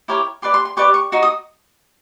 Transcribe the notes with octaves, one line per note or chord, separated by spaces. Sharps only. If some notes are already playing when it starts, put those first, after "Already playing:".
E4 G4 A#4 C#5
G4 B4 D5 C6
C6
C6
G4 B4 D5 C#6
C#6
D#4 F#4
D#6